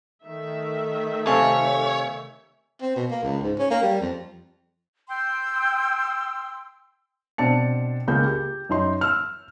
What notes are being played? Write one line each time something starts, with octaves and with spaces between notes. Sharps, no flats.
D#3 A3 E5
C3 C4 A4 C#5 F5 G#5
C4
B2
A#3
C#2
G#2
C#4
A#3
G3
F2
G5 C6 E6
B2 C4 D4 A5 C#7
C#2 A#3 G#4 G6
G4
F#2 D#4 C6
E6 F6